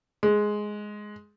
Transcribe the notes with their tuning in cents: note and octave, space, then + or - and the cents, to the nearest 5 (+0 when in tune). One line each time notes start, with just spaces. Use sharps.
G#3 +5